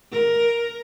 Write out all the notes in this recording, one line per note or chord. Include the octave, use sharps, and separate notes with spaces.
A#4